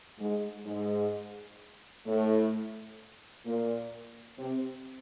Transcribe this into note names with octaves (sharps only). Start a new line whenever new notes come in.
G#2 G#3
G#2 G#3
A2 A3
A#2 A#3
C3 C4